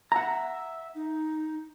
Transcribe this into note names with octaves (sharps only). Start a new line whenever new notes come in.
E5 F#5 A#5
D#4